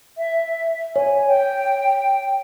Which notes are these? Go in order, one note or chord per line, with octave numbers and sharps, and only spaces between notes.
E5
C#5 G#5
G5